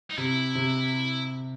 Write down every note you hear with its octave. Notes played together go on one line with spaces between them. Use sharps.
D#4
C3 E4
C3